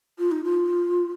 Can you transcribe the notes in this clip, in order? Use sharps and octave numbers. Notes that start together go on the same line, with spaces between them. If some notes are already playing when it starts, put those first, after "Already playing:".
F4
D#4
F4